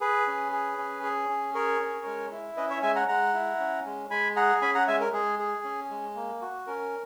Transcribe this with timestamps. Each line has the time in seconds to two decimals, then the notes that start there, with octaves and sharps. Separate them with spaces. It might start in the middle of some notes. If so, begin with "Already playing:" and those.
0.01 G#4 B4
0.27 C#4
0.52 G#4
0.78 C#4
1.03 G#4
1.29 C#4
1.54 G#4 A#4 C#5
1.80 C#4
2.06 G#3
2.32 E4
2.57 C#4 B4 D#5
2.70 C#5 E5
2.82 G#3 E5 G#5
2.96 F#5 A#5
3.08 G#3 F#5 A#5
3.34 E4
3.60 C#4
3.85 G#3
4.10 G#3 G#5 B5
4.36 G#4 F#5 A#5
4.62 C#4 G#5 B5
4.75 F#5 A#5
4.87 G#3 E5 G#5
5.00 A#4
5.13 G#3 G#4
5.39 G#4
5.64 C#4
5.90 G#3
6.16 A#3
6.41 F#4
6.67 C#4 A#4